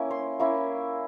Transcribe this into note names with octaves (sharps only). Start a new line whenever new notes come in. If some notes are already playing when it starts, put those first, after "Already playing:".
Already playing: A#3 C#4 E4
C6
A#3 C#4 E4